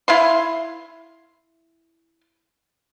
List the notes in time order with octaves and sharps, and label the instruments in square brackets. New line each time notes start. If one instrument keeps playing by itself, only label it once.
[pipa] E4 F5 C6